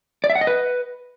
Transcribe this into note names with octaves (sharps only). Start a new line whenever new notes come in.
D5
E5
F#5
D#5
B4